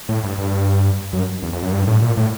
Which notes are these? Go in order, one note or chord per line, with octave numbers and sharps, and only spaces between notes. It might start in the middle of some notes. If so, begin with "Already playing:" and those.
A2
G2
G2
F#2
E2
F2
F#2
G2
A2
A#2
A2